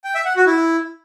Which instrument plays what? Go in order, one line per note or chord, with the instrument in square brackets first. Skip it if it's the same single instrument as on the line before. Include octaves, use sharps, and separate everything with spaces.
[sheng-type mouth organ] G5
E5
F#5
F#4
E4